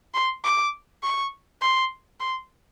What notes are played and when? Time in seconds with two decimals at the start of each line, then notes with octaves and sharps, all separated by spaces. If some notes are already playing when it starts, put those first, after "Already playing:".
0.14 C6
0.44 D6
1.03 C#6
1.61 C6
2.20 C6